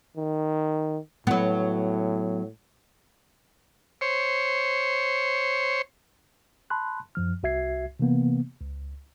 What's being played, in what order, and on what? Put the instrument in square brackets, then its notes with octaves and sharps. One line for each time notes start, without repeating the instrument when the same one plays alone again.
[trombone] D#3
[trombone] A2 [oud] F#3 B3
[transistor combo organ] C5 C#5
[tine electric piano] A5 B5 C6 F#6
F#2 F3 F6
C2 F#4 E5 G#6 C7
C3 E3 A#3 B3
C#2